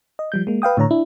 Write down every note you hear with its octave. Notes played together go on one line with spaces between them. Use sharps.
D#5
F3 G3 G6
G#3 A#3
B4 F5 G5 D#6
A2 D3 C#5 A#5
D4 E4